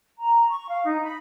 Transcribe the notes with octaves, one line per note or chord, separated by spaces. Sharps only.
A#5
C#6
F5
D#4
B5